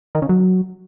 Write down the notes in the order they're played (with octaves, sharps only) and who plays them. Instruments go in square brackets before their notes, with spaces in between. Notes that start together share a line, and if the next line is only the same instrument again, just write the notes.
[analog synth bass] D#3
C#3
F#3